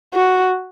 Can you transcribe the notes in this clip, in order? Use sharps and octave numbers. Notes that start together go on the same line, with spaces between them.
F#4